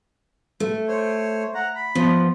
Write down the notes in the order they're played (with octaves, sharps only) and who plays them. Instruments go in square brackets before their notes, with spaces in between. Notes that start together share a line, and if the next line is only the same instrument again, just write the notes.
[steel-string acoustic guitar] A3
[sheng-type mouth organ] C5 C#5
F#5 A#5
B5
[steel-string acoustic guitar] F3 [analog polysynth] B3